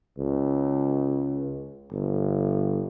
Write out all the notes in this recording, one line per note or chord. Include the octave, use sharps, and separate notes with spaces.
C#2
G1